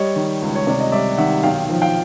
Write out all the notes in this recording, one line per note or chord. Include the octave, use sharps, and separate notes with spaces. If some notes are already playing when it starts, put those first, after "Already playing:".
Already playing: G3 C#5 D#5
D#3
C#2
C#5
C3 D5
D#5
G3 D5 E5
D#3 E5 F#5
B1 F5 G5
F3
F5 G5